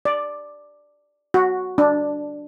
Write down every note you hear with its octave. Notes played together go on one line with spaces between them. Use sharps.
D5
F#4
D4